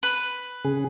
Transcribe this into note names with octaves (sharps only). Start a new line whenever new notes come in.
B4
C#3 G#4